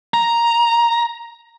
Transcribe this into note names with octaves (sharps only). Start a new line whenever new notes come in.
A#5